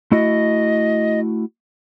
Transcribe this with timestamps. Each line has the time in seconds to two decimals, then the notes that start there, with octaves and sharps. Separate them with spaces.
0.12 A3 E4 F#4 D#5